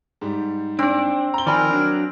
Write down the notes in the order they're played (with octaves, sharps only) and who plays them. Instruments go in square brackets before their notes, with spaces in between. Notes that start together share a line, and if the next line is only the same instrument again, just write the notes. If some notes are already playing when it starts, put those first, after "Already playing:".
[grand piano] G#2 G3
[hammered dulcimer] C4 [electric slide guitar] D4 D5
[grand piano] A#5 G7
[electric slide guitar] D#3 F3 [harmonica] A#4 [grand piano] D5 G#5 B5
[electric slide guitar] F#3 D4